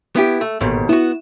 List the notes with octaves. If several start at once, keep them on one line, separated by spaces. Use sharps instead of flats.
B3 E4 G4
A3
A1 D#2 G#2 B2
B3 E4 F#4